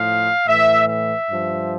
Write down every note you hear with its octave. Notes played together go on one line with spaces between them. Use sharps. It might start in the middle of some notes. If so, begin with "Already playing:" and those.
Already playing: A2 F3 F5
A2 E3 E5
E5
G2 F3